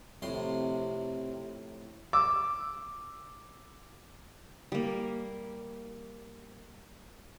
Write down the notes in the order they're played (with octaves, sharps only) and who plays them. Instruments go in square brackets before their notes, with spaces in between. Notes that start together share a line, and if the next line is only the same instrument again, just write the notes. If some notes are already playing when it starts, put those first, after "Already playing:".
[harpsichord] F2 A2 C6 [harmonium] C3
[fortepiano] D6 E6
[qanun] G3 A#3